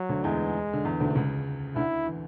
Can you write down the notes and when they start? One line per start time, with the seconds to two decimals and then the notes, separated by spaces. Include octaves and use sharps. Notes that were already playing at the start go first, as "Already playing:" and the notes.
Already playing: F#3
0.09 D2 D3
0.24 E2 E3 G#3
0.73 D3
0.85 E2 E3
1.00 D2 D3
1.10 D3
1.15 C#2 C#3
1.75 D2 D3 E4
2.06 E3